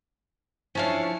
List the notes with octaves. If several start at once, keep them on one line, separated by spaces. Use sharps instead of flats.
F3 C#4 D4 E4 C#5 F5